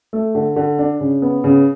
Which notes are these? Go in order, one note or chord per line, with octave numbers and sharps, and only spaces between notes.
A3
D3
D3
D4
C#3
B3
C#3